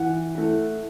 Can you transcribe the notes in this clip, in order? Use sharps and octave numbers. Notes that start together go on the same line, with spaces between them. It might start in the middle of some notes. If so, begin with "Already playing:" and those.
Already playing: E3 F#5
A3 E4